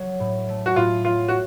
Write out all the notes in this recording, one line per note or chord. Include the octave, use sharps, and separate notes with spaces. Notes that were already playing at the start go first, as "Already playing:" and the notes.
Already playing: F#3
A2
A3
F#4
A2 F4
F#3 F4
F#4